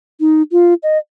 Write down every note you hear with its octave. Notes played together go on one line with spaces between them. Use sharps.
D#4
F4
D#5